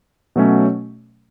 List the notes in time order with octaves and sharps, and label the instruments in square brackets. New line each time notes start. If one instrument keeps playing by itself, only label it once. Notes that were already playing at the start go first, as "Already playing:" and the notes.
[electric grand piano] B2 F#3 A3 C#4